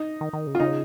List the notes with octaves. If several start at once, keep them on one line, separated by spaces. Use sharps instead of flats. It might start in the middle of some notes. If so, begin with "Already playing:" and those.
Already playing: D#4
D#3
D#3
C#3
F4
C#3 D#4